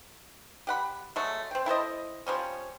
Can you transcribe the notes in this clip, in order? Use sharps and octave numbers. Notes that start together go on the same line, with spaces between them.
G4 F#5 B5
F#3 G#3 A3
C4 G5
E4 A4 C5 D#5
F3 G3 C#4